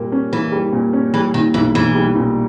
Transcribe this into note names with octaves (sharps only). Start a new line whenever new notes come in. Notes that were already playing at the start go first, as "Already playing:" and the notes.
Already playing: A#2 G3 A#3
C#4
E3 A#3
G3
A#2
C#4
E3 G3
A#2 D#3
B1 E3
B1 E3
G3
A#2